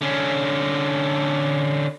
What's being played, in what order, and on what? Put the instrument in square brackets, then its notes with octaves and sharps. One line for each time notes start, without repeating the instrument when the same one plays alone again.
[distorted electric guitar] D3 C#4